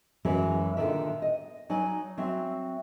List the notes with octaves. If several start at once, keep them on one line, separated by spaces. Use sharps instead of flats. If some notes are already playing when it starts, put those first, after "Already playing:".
F#2 E3 F#3 G#3 C#4 E4
A#2 D3 D#3 D4 E5
D#5
F#3 D#4 D5 G#5
F#3 C4 E5